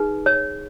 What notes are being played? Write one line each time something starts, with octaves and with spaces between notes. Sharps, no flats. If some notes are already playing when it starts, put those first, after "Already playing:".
Already playing: D#4 G#4 B4
C#5